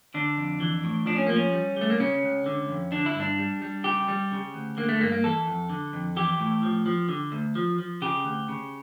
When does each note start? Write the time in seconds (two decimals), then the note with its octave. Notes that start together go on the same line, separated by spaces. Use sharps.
0.14 D3 D4
0.37 F2
0.60 E3
0.84 A2
1.06 F3 D4
1.16 C#4
1.27 F3 A#3
1.36 C#4
1.53 G3
1.77 G3 A3
1.90 A#3
2.00 C#3 C#4
2.23 C#2
2.46 D3
2.69 F2
2.92 D3 D4
3.06 E4
3.15 G2
3.20 D4
3.39 G3
3.62 G3
3.84 C#3 G4
4.08 G3
4.32 C#3
4.54 D2
4.77 D3 A#3
4.89 A3
5.00 G2 A#3
5.12 A#3
5.24 E3 A4
5.47 F2
5.70 D3
5.93 F2
6.16 E3 G4
6.40 A2
6.63 F3
6.86 F3
7.09 D3
7.32 D2
7.55 F3
7.79 F3
8.02 C#3 G4
8.25 D2
8.48 C#3